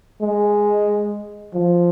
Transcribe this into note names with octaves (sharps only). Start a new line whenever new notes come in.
G#3
F3